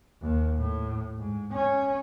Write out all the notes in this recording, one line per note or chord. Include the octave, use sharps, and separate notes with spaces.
D#2
A2
G#2
C#4